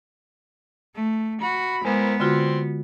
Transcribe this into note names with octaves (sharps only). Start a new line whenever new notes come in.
A3
F#4 B5
G#3 B3 E4 A#4 C5
D3 C4 F4 F#4 C6